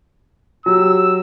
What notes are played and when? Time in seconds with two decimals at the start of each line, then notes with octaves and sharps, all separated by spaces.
0.66 F#3 G4 E6